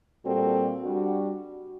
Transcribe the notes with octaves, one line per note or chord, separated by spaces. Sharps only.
A#2 G3 C4 F#4 A4
G3 D4 F#4